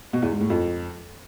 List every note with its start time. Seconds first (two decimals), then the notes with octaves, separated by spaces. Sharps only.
0.13 B2
0.22 E2
0.32 G#2
0.41 A2
0.50 F2